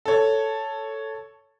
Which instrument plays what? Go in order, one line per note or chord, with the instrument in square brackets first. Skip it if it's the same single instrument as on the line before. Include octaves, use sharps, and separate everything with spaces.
[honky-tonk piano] A4 C#5